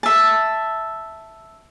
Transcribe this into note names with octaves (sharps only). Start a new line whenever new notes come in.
E5 A5